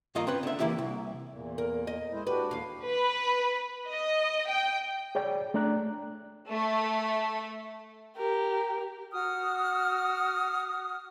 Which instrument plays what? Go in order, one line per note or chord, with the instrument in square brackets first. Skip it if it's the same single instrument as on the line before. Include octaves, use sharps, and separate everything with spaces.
[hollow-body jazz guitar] G2 D#3 A#3 F4 D#5 A#5
C4 C#4 B4
D3 E5
E3 A#3 E4 G4
C2
[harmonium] E2 A#2
[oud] A#4
D#5
[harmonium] G#3 E4 C5
[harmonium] D4 F#4 G4 [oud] B4
[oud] D#2 F5
[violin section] B4
D#5
G5
[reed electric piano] G#4 C#5 D5 G5
A3 D4 D5 A#5 F#6
[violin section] A3
[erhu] G4 [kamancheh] A#4
[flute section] F#4 D#6 F6